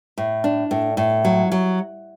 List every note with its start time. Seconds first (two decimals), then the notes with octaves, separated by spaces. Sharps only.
0.18 A2
0.44 D4
0.71 A2
0.97 A2
1.25 F#3
1.52 F#3